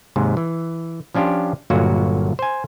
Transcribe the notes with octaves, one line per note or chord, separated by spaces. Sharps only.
D#2 G#2 C3
E3
F3 C#4 D4 F4 G4
G1 G2 A#2 F#3 A#3 F#4
C5 G#5